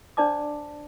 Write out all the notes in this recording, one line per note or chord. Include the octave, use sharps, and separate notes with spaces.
D4 C5 D5 A5 D6